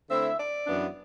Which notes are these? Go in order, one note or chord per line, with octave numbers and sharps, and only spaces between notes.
D3 A3 C4 E4 E5
D5
F#2 E3 B3 D4